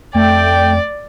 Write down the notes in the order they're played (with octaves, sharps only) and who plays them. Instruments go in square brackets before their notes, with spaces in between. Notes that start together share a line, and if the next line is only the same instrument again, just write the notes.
[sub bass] F2 [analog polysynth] A3 [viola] D5 [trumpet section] G5